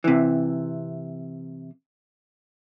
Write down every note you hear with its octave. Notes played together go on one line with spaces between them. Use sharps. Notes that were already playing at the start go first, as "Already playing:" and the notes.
C3 E3